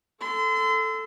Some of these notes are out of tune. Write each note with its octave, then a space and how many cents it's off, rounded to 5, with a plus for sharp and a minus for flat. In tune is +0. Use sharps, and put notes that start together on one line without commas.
A4 +0 C6 -35